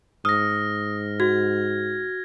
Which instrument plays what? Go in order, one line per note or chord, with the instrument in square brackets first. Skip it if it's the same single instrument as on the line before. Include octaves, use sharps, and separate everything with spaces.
[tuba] G#2 [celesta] D#6 [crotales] F6 A#6
[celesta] F#4 [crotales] G#6